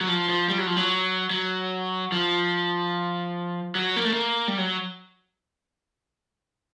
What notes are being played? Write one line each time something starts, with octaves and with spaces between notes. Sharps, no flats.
F#3
F3
F3
G3
F#3
F3
F#3
F#3
F3
F#3
A#3
A3
A#3
G3
F#3